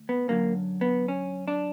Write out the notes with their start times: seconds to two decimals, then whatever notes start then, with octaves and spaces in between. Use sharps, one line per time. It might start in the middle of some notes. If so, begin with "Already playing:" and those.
Already playing: D2
0.09 B3
0.28 F#2 D3 F#3 A#3
0.81 B3
1.08 C#4
1.48 D4